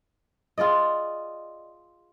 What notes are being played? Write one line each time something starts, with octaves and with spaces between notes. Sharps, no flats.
F4 G#4 D5 D#5